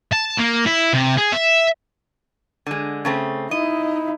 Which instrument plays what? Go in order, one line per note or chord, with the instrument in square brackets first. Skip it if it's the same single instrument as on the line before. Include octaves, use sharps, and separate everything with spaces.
[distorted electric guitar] A5
A#3
E4
C3
G#4
E5
[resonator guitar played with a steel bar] D3 G#3
C#3 A3 C4
[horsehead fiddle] D#4 E4 [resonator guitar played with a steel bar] D#5